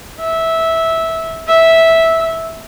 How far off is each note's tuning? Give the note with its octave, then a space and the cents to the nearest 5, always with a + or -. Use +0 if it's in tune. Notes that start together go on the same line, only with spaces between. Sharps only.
E5 -15
E5 -10